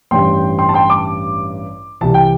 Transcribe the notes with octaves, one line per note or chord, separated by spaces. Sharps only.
A1 G2 E3 G3 G5 C6
G5 C6
A5
G5 C6
A5 D6
C2 C3 E3 A5
G5